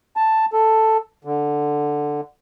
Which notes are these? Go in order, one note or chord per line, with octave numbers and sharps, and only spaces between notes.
A5
A4
D3